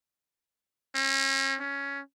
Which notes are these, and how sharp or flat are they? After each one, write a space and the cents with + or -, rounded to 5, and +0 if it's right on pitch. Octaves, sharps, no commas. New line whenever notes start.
C#4 -40
C#4 +10